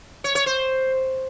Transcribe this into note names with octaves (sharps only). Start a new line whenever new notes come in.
C#5
C#5
C5